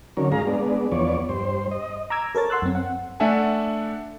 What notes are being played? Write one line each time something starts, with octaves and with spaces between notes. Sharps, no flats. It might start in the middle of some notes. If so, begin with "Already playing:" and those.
D3 D#3 F#3 C#4 A#4
G#2 G#4 F5 A#5
G#3 B3 D4
E2 F3 B3 C#5 D5
G2 C5
D#5
A#5 D6 E6 G#6
A4 A#4 C#5 A6
F#5 C6 E6 F#6
F#2 C4
F#5
A3 D4 E5 F#5 G#5 A5